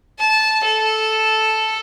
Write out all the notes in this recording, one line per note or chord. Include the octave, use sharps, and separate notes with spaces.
A5
A4